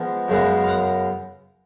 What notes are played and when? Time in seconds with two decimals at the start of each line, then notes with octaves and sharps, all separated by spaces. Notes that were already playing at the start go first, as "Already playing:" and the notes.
Already playing: F3 G#3 B3
0.28 F#2 C#3 G#3 B3
0.63 F5
0.68 F#5